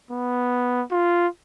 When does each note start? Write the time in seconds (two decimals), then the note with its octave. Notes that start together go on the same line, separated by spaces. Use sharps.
0.11 B3
0.91 F4